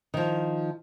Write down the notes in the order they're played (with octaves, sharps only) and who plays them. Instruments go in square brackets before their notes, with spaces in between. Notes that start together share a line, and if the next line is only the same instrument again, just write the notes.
[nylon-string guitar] D#3 F3